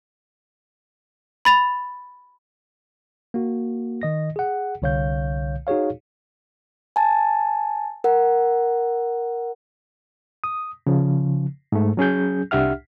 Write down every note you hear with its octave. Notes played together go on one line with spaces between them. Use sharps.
B5 A6 F7
A#3 F#4
D#3 D#5 A#6
G#4 F#5
C2 D3 C#5 F5 G6
D#4 F#4 G#4 C#5 F5
G#5 A5 A6
A#4 F#5
D#6
C#3 F3
G#2 A3
F#3 C#4 G#4 G6
C2 D4 G4 E5 F#5 F6